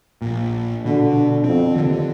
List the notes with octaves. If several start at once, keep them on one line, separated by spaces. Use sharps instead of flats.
A#1 A#2
B2 D3
F2 C4
D#2 D3